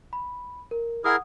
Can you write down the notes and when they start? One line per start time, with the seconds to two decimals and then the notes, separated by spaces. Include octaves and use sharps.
0.13 B5
0.71 A#4
1.04 E4 G#4 A#4 F#5 D#6